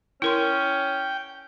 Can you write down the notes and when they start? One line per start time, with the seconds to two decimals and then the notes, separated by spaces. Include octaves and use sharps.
0.22 C#4 E4 A#4 G5 C6